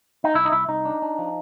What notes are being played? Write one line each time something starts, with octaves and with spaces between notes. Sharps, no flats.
D#4
C2 E4
D#4
C2 E4
C2 D#4
D4
D4
F3